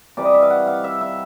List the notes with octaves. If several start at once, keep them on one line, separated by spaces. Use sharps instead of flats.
C3 E3 G3 D5
D#5
E5
F5
F#5
F5
E5
E5